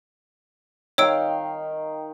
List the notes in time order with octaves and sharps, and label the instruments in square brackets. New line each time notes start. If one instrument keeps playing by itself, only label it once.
[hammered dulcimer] D#3 F5 G5 [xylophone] C#5 E6 D7